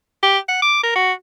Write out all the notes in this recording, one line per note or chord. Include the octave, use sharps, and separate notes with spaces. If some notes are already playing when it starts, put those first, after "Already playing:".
G4
F#5
D6
A#4
F#4